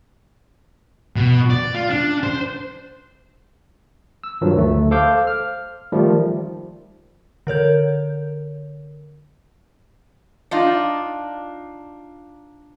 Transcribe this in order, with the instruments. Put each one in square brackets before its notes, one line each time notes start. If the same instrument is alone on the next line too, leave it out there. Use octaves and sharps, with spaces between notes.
[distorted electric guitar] B2
D5
F4
D4
C5
[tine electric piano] E6
G2 D#3 F3 F#3
D2 A3
A4 C5 F5 D6 E6 G6
F6
D#3 F3 G3 A3
[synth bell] D3 A#4 C#5 G6
[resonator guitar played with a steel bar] D4 D#4 F4